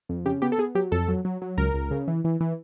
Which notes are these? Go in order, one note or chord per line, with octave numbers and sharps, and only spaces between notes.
F2
C#3 G4
B3 G4
A4
B3 G#4
F#3 G4
F2 A4
F#3
F#3
F#3
C#2 A#4
C#2
C#3
E3
E3
E3